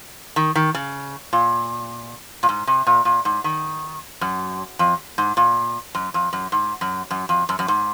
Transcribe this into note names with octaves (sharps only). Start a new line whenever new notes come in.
D#3
D#3
C#3
A#2
A#2
G#2
C3
A#2
A#2
G#2
D#3
F#2
F2
G#2
A#2
F#2
F2
F#2
G#2
F#2
F#2
F2
F#2
F#2
G#2